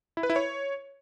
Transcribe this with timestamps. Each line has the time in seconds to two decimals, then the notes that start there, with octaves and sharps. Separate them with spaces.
0.17 E4
0.23 B4
0.30 E4
0.36 C#5